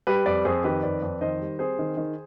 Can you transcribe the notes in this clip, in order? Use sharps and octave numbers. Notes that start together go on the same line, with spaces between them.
G3 G4 B4
F2 B4 D5
F2 G#4 C5
D#3 G4 B4
F2 B4 D5
F2
D#3 C5 D#5
G3
C4 G#4 C5
D#3
D#3